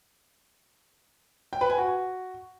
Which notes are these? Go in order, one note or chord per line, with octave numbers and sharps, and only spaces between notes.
G5
B4
G#5
F#4